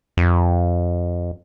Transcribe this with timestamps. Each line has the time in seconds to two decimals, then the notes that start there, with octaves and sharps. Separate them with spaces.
0.17 F2